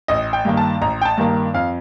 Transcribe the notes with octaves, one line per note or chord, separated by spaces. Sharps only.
A1 D#5
G5
G2 D#3 A#3
A5
A1 A#5
G5
A5
G2 D#3 A#3
F2 F5